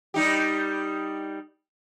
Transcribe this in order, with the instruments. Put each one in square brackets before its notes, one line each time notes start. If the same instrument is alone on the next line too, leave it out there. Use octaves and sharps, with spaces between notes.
[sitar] G3 D#4 G4